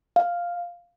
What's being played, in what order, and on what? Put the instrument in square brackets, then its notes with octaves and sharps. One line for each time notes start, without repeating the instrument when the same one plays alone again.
[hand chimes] F5